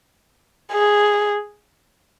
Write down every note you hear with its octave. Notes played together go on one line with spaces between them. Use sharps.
G#4